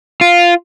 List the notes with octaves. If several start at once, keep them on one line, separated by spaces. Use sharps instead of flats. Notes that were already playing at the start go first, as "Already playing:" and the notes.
F4